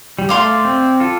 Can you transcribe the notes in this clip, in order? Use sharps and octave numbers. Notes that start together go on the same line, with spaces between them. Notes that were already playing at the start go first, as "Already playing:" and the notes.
G3
A3 D5 F5 C6
C4
F4 A4